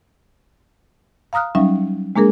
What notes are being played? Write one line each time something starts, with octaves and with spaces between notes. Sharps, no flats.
F5 A#5 D#6 F6 F#6
F#3 G3 C#4 D#4 E5 F5
G#3 A#3 D4 G#4 A#4